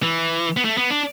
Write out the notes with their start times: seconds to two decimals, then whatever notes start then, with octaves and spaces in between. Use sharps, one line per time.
0.03 E3
0.57 B3
0.65 A3
0.77 B3
0.90 D4